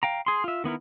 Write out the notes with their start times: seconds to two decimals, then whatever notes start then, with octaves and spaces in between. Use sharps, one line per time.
0.03 F5 G5 A#5
0.26 G#4 C6
0.44 F4 E5
0.64 D#3 B3 E4 A#4